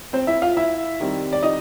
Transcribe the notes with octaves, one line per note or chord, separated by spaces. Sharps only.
C4 C5
E4 E5
F4 F5
E4 E5
D#3 G3 C4
D5
D#4 D#5